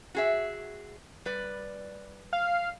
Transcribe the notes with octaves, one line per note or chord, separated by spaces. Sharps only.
F#4 G#4 E5
G3 B4 D5
F5